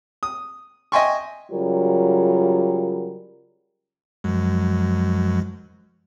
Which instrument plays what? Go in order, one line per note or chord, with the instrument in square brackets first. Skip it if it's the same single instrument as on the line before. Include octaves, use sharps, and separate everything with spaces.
[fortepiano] D#6
D#5 E5 G5 G#5 C6 C#6
[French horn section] C#3 F#3 G3 F4 A#4
[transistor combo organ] F#2 [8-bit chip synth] F3 G#3